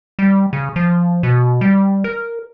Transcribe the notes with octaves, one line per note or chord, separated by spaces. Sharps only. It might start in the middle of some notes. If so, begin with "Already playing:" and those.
G3
C#3
F3
B2
G3
A#4